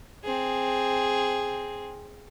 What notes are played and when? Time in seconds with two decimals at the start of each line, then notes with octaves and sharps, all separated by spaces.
0.23 C4 G#4